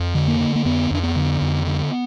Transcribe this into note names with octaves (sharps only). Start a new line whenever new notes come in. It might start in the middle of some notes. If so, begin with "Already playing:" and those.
Already playing: F2
D3
A#3
D3
A#3
F2 B3
F2 D4
B3
D3
F2
D3